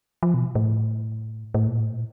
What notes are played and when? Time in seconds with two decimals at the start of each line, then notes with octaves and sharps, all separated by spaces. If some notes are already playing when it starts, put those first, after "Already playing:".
0.23 F3
0.34 B2
0.55 A2
1.54 A2
1.67 A#2
1.80 A2
1.92 A#2